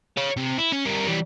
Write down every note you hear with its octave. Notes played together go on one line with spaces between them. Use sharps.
C#5 F5
C3
E4
C#4
G3 A#4
E3 G3